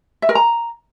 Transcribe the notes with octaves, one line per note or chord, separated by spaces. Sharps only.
E5
A#4
A#5